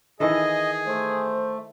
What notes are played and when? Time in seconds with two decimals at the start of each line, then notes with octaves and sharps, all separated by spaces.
0.20 D#3 E3 G#4 A4 D#5
0.87 A3 C5